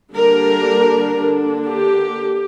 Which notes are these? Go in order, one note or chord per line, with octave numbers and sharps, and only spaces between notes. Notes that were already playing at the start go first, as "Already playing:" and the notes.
D3 G3 A#3 D4 A#4
D3 A#3 D4
G4